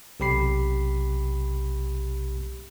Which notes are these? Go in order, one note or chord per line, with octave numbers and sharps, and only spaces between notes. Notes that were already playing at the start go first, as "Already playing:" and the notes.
B1 C3 G4 B5 C7